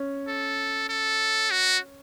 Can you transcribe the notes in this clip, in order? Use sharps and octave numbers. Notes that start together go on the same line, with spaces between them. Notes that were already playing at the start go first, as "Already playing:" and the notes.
Already playing: C#4
A4
A4
F#4